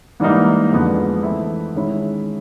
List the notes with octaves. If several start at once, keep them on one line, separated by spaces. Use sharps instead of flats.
G#2 E3 G3 A#3 D#4
F2 D3 F3 G#3 B3
E3 A3 C4 E4
D#3 G#3 C#4 E4